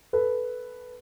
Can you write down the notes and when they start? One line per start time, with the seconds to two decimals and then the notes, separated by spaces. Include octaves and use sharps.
0.13 A4 B4